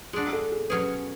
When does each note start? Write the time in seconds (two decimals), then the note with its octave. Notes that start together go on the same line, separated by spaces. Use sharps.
0.13 G#3 G#4
0.16 D4 F#4
0.33 A4
0.52 G#4
0.70 B2 F#3 C#4 G#4 B4